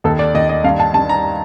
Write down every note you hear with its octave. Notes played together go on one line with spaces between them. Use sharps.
D#2 A4
D5
D#2 D#5
D#5
G2 F5
A5
G2 A5
A#5